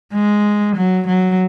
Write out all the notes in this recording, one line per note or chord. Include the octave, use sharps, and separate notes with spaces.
G#3
F#3
F#3